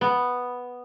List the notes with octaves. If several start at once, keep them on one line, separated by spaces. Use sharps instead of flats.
B3